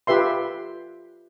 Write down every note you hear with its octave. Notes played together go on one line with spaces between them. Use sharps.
F4 G4 B4 E5 C6